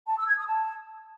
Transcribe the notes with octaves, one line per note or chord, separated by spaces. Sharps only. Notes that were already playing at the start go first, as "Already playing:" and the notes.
A5
E6
G#6
D#6
A5